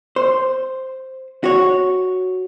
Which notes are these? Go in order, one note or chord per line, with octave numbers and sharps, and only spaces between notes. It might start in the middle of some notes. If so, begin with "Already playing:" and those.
C5
F#4 C#5